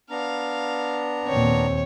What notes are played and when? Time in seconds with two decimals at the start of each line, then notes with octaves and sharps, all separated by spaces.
0.10 B3 D4 F5 A#5
1.28 D#2 A#2 C4 C#5